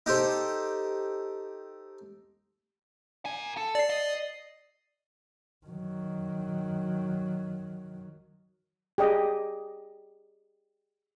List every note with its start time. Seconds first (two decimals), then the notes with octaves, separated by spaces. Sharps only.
0.06 D#4 G4 A4 C5
3.25 A#4 G#5
3.57 A4
3.75 D5 C7
3.90 D#5
5.67 D#3 F#3
8.98 G4 G#4 D#5